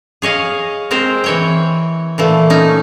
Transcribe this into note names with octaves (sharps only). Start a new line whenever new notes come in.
G#4 C#5 D#5 F5
G#3 C4 A#4 C5
E3 C#5 G5
A#2 E3 A3
C#4 D#4